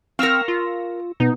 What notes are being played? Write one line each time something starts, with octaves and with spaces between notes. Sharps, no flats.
C4 A#4 F5 C#6 E6 A#6
F4
B2 B3 D#4